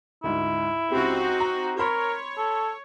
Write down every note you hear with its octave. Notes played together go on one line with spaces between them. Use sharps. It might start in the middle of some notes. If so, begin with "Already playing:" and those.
D2 G#2 E4
C#2 C4 D#4 F#4 G4
A#5
A#4 C#5 B5 C6
A4